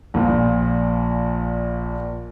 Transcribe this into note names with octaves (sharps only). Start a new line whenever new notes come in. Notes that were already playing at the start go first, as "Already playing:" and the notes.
A#1 A#2